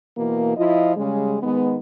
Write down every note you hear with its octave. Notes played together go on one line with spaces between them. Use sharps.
B2 E3 A#3
F3 E4 F4 D#5
C#3 G3 G#3
D#3 G#3 B3